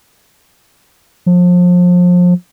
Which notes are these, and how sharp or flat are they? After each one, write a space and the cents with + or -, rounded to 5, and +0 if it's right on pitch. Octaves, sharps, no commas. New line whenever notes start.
F3 +30